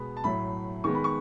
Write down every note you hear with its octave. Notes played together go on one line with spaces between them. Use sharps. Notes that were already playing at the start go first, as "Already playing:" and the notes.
Already playing: B2 G#3 B3 B5
A5
A2 F#3 A3 B5
D#3 G#3 B3 C#6
B5
C#6